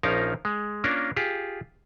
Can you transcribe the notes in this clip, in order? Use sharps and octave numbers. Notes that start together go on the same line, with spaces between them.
A#1 F3 C#4 D#4 A#4 F5
G#3
A#3 C#4 D4 F4 A#4
F4 G4 G#4